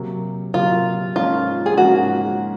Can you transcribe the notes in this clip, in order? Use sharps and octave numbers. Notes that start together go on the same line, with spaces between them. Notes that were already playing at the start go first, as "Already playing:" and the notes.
Already playing: C3 F#3 A#3
C3 F#3 A#3 F4
G#2 F3 A#3 C#4 F4
G#4
G#2 F3 A#3 C#4 F#4